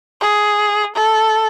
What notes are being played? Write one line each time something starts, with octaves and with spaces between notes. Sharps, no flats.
G#4
A4